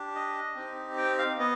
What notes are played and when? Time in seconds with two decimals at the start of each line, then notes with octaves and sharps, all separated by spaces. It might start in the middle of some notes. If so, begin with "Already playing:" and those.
Already playing: D4 G4
0.15 D#5
0.56 C4 D#4 G4
0.98 G5
1.18 F5
1.38 B3 D#5